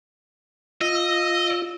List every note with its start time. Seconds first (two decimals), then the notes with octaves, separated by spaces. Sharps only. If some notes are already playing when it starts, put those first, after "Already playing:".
0.81 F4 D#5 E6